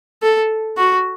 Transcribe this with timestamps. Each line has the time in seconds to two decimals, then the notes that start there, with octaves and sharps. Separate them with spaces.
0.23 A4
0.78 F#4